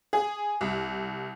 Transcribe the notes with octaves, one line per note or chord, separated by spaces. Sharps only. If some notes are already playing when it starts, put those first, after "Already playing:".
G#4
C2